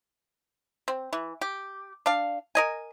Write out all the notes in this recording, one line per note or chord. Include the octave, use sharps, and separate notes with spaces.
C4
E3
G4
D4 F5
A#4 D#5 G#5